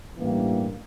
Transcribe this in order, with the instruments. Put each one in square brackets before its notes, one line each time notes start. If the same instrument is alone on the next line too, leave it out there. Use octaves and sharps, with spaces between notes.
[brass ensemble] A1 G2 E3 G3 A#3